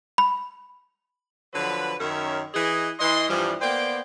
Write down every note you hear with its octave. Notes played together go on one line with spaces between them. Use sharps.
B5
D3 F3 F#3 B4
F#2 D#3 C#4 A#4 C#5 E5
E3 G#4 D#5
E3 D#5 C6
G2 E3 F3 G3
A#3 B3 C5 D5 G5